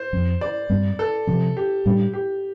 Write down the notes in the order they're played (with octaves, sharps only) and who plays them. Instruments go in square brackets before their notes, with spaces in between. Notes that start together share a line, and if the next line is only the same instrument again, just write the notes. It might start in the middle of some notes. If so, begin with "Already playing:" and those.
Already playing: [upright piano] C5
[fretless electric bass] F2 F3 C4
[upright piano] D5
[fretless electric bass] G2 G3 C4
[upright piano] A4
[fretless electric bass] C3 F3 C4
[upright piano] G4
[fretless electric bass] A2 G3 D4
[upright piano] G4